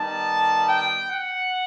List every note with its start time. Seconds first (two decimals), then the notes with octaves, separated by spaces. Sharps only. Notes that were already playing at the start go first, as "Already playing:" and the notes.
Already playing: D#3 G3 B3 D#4 A5
0.68 G5
1.10 F#5